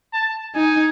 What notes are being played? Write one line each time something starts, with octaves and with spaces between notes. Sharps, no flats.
A5
D#4 G#5